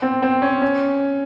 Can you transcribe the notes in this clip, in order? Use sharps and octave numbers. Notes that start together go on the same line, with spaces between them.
C4
C4
C#4
C#4